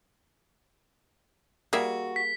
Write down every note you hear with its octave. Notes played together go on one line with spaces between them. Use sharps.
G3 A#3 F#4 G#4 E5
B6